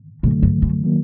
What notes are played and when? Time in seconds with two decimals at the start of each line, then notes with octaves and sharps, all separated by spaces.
0.23 F#2 A#2 D3 F#3 A3
0.43 G2
0.62 F#2
0.84 D#3 F#3 A#3